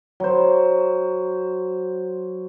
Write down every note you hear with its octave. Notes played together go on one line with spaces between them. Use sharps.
F#3 C5